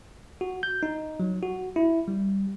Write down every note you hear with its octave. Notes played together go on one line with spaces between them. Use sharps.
F#4
G6
D#4
F#3
F#4
E4
G3